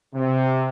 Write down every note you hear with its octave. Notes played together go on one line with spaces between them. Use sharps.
C3